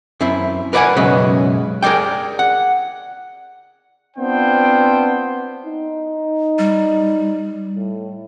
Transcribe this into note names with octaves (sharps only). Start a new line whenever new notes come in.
F#2 C4 E4
A#4 B4 D5 E5 F#5 G#5
B1 F#2 C#3 G#3 B4
G#4 A#4 C#5 D5 G5
F#5
B3 C4 D4 F4 C5 G5
D#4
G3
A2